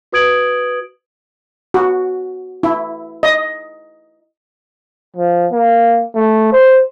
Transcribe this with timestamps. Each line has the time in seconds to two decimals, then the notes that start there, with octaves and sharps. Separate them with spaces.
0.12 F#4 B4 D#6 G#6 D7 F#7
1.74 F#4
2.63 E4
3.23 D#5
5.17 F3
5.52 A#3
6.15 A3
6.52 C5